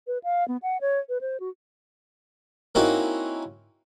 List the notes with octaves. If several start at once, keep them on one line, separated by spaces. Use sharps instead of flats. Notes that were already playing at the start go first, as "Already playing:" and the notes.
B4
F5
B3
F#5
C#5
B4
C5
F#4
A#3 C4 C#4 D#4 E4 F#4